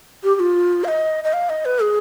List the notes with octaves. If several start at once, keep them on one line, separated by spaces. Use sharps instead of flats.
G4
G4
F4
F5
D#5
D#5
F5
D#5
B4
G#4